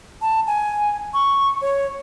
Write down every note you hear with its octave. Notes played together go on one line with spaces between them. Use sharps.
A5
G#5
C#6
C#5